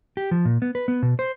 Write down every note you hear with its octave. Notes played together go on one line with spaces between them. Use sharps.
G4
F3
A#2
B3
B4
B3
B2
C5